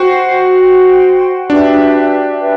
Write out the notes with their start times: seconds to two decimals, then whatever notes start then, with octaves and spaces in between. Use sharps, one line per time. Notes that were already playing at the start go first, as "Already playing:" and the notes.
Already playing: F#4 C5 G5 C6
0.58 C5 G5 C6
1.49 D4 G4 B4 E5 G5
2.40 G4 B4 E5 G5